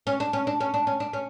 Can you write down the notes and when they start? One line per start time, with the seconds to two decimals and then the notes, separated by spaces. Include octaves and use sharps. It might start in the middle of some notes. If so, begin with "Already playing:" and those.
0.07 C#4
0.20 D4
0.33 C#4
0.47 D4
0.60 C#4
0.74 D4
0.87 C#4
1.00 D4
1.13 C#4